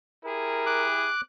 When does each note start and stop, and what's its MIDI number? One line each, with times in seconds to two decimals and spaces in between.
0.25 1.11 64
0.25 1.11 67
0.25 1.11 68
0.25 0.88 70
0.66 1.21 86
0.66 1.21 90